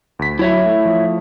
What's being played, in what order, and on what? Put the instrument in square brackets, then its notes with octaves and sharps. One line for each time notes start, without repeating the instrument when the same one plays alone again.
[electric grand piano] D2 B6
[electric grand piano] F#3 [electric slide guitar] E4 C#5 E5
[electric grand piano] A3
F3 A3